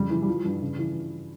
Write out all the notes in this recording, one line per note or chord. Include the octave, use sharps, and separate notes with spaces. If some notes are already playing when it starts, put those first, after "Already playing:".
Already playing: F2 C#3 G3
E3
G3
E3 F3
G2
C#3
E3